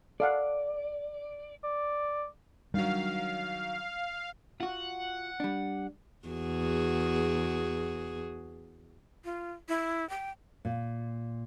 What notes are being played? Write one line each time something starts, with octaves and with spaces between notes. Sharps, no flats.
A4 D5 F5 F#5
D5
D#3 F#3 G3 D4 F5
F4 F#4 F#5
G3 D4
E2 F#4 G#4
F4
E4
G5
A#2